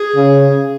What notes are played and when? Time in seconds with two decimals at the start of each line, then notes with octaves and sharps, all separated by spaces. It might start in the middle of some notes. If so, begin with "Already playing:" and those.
Already playing: G#4
0.16 C#3